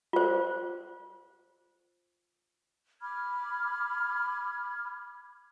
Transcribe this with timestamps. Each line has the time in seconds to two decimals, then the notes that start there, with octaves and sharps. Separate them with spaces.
0.13 F4 C5
3.01 B5 D6 F6 G#6